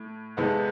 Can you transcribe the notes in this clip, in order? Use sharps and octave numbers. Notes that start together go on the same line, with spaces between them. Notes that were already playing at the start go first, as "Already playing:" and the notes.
Already playing: A2
F2 C3 E3 G#3 B3